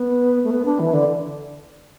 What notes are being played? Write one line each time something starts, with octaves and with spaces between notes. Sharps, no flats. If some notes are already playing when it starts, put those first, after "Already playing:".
Already playing: B3
A3
B3
D4
E3
D3